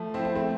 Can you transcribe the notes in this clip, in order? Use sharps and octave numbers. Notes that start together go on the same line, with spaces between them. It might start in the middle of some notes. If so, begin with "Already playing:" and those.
Already playing: F3 A3
C4 E4
C4 E4
A3 C4